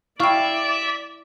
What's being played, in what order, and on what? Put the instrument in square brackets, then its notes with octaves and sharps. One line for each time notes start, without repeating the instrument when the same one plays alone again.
[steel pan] E4 F5 [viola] D5 [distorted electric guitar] E5 [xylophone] G5 C#6